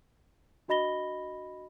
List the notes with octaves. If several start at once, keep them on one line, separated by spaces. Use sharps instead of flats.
D4 F#4 D#5 B5 A#6 G7